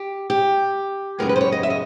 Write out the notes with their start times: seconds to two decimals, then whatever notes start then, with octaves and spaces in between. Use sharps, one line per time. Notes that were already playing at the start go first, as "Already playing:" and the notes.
Already playing: G4
0.30 G4
1.19 F#2 C#3 F3 G#3 B3 A#4
1.29 B4
1.36 C5
1.41 C#5
1.52 D#5
1.63 E5
1.70 D#5